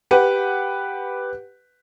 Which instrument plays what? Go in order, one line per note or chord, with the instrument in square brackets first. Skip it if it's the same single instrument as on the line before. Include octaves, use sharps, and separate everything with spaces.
[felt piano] G4 B4 F#5